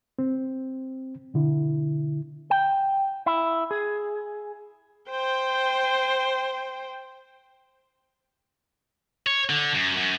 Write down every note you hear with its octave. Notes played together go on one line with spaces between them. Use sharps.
C4
B2 D3 E4
G5
E4
G#4
C5 G5
C#5
D3
F#2
F#2